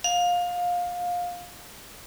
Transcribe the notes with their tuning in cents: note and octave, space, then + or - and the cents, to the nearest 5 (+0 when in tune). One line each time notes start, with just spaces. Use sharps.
F5 +20